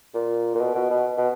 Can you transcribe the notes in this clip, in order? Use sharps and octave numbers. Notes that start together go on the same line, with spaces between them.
A#2
A#2
B2
B2
B2
B2